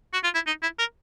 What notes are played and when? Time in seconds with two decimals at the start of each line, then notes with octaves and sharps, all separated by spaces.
0.13 F#4
0.24 F4
0.34 E4
0.46 D#4
0.62 E4
0.79 A#4